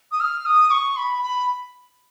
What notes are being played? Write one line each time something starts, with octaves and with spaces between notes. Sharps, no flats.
D#6
F6
D#6
C#6
B5
B5